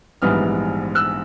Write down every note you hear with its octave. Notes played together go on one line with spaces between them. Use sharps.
A#1 G#2 E3 G3 B3 D#6 F6
E6 F#6